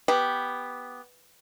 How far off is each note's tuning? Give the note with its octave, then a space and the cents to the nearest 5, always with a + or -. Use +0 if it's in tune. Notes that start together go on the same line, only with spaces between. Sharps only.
B3 +0 G4 +0